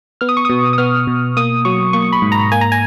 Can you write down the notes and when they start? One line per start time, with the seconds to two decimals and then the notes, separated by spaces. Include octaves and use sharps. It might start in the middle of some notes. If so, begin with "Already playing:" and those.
0.21 B3 F6
0.29 D#6
0.37 C#6
0.45 B2 D#6
0.73 D#6
0.78 B3 F6
1.07 B2
1.37 A#3 D#6
1.65 F#3 C#6
1.93 A#3 C#6
2.12 B5
2.22 G#2
2.32 A#5
2.52 A#3 G#5
2.61 A#5
2.72 G#5